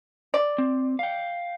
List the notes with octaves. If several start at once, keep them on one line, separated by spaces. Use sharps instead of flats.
D5
C4
F5 G5